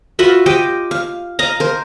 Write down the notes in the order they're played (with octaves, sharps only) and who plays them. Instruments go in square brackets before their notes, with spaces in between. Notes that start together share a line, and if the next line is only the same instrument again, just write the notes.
[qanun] F4 F#4 B4 E5
G4 C5 D#5 G5
F5
D#5 F5 A#5
A#4 C5